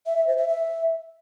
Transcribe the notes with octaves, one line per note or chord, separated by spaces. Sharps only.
E5
E5
C5
E5
E5